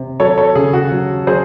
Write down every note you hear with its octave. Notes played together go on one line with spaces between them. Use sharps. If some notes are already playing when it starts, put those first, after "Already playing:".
Already playing: C3
F#3 A4 C#5
A4 C#5
C#3 G#4
F#4
F#3
F#3 G#4 C5